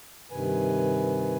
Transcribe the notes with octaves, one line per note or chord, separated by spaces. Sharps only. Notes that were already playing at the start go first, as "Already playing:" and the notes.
G2 C3 D#3 B4 G#5